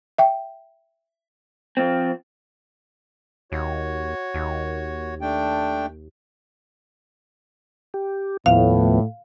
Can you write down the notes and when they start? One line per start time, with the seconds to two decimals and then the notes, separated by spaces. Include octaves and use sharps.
0.18 E5 G5
1.77 F3 C4
3.52 D#2 F#4 C#5
4.34 D#2
5.21 A3 D4 G5
7.94 G4
8.46 D#2 A2 F3 B3 F5